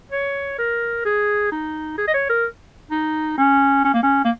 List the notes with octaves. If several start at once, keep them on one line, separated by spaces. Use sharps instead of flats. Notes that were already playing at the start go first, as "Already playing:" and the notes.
C#5
A#4
G#4
D#4
G#4
D#5
C#5
A#4
D#4
C#4
C#4
A#3
C#4
A#3